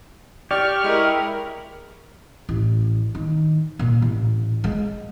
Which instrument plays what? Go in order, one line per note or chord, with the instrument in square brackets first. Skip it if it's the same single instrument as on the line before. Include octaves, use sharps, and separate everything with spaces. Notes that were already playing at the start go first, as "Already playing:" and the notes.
[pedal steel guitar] G4 [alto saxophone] D5 [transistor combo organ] C#6 F6
[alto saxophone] G#3 [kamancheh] E4 A#4
[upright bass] A1
D#3
A#2
A1
G#3